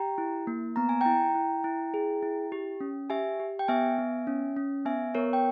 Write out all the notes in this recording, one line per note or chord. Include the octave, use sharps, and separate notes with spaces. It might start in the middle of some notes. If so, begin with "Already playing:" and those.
Already playing: G4 G5 A#5
E4
A#3
B3 A#5
G#5
E4 G5 A#5
E4
E4
G#4
E4
G4
C#4
G4 E5 G#5
G4
G5
B3 E5 G#5
B3
C#4
C#4
B3 E5 G#5
B3 A#4 C#5
G5